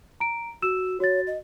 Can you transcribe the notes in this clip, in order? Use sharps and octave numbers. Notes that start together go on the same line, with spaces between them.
A#5 D7
F#4 E6 E7
F#4 C#5 A6
D#5